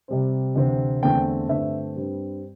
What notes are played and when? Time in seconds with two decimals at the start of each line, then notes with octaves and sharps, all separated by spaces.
0.08 C3 G3 C4
0.55 D2 C3 E3 C4
1.03 E2 D3 A3 C4 G5
1.49 G2 D3 A3 C4 E5
1.95 G2 G3 C4